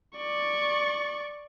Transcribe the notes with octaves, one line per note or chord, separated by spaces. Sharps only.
D5 C#6